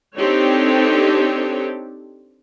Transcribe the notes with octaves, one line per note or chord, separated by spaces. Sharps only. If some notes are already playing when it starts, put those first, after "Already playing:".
C4 D4 D#4 G4 A4 C#5